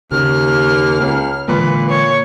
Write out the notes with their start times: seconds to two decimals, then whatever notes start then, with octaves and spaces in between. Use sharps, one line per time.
0.12 D#2 C#3 F6
1.00 C#2
1.48 A#2 D3 E3 G#3 B4
1.89 C#5